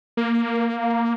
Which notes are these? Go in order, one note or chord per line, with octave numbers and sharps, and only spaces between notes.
A#3